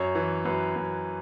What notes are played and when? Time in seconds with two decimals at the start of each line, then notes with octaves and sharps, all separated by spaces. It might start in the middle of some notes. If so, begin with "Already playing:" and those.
Already playing: F#2 C#5
0.15 E3
0.45 F#2 B4
0.76 F#2